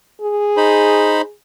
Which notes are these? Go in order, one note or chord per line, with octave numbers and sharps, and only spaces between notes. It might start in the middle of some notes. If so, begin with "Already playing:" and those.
G#4
D#4 C5 B5